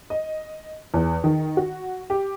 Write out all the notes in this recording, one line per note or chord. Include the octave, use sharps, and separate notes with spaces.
D#5
E2
D#3
F#4
G4